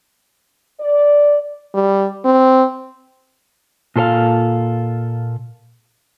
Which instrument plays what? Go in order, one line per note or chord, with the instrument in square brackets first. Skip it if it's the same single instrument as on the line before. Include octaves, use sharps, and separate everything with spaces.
[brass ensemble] D5
[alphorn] G3
C4
[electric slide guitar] A#2 F4 A4 C5 F5